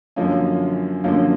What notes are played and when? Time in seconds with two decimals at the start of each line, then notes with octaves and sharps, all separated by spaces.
0.16 F#2 D3 F3 A#3 C#4
1.04 F#2 D3 F3 A#3 C#4